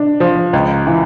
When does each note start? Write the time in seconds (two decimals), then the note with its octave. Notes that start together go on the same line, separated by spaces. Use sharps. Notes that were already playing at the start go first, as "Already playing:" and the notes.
Already playing: D4
0.20 F3
0.53 C#2
0.87 E3